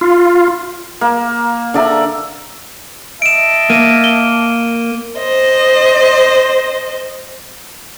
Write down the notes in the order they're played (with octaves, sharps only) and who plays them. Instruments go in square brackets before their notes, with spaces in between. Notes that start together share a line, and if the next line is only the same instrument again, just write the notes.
[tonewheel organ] F4
[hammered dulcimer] A#3
D3 D5 E5 A#5
[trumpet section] D#5 E5 A5 [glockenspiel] D7 E7
[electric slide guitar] A#3 [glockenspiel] D#7
[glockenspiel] G7
[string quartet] C5 D#5